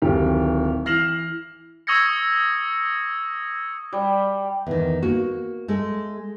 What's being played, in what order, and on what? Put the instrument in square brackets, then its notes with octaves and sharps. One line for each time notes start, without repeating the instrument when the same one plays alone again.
[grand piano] D1 D#3 G4
E3 F6 A#6 C7 E7 F#7
[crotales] C#6 D#6 E6 G#6 A#6 C#7
[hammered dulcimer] G3
[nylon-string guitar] E2 D#3
A#3 F#4
G#3 A3